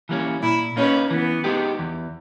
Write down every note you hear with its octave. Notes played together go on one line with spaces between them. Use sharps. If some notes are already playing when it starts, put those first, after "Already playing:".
E3 G3 A#3 C#4
A#2 E4
A#3 C#4 D#4 G#4 B4
E3 B3
G#3 D#4 G4
E2